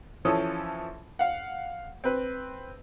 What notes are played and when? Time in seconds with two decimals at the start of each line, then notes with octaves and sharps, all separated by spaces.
0.25 E3 F3 C#4 A4 D#6
1.19 F5 F#5
2.04 C4 B4